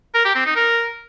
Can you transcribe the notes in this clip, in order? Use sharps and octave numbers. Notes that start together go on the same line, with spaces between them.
A#4
G4
C4
D#4
A#4